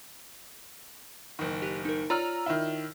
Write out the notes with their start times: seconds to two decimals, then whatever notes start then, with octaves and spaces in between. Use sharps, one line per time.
1.39 F#1 D#3
1.62 G4 F#6 D#7
1.85 D#4 A#4
2.10 F4 C#5 D5 A#5 E6 F6
2.46 D#3 E4